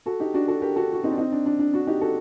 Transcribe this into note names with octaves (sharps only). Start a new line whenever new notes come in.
F#4 A4
D#4 G4
D4 F#4
F#4 A4
G4 A#4
F#4 A4
F#4
C4 D#4
D4
C4 D#4
D4
D4
D4
D4 F#4
D#4 G4
F#4 A4